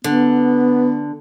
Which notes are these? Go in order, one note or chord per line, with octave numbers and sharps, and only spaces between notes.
D3 B3